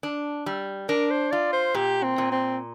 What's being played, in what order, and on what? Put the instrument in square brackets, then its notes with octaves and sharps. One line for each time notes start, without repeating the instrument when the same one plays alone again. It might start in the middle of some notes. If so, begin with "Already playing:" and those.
[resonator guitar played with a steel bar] D4
G3
[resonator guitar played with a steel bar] D4 [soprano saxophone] A#4
[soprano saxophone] C5
[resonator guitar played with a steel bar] F4 [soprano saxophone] D5
[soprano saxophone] C5
[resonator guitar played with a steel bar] A#2 [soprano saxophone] G4
[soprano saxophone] C4
[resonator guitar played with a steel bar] A#2
[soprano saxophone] C4